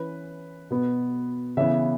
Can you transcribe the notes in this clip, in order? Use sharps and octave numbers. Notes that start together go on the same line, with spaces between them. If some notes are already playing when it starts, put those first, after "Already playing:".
Already playing: E3 C#4 B4
B2 B3
C#3 E3 B3 E5